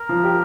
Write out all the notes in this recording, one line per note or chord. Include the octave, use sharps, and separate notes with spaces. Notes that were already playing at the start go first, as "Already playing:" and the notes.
Already playing: A#4
F3
G4